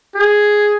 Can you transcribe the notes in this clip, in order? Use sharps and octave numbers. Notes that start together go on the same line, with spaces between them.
G#4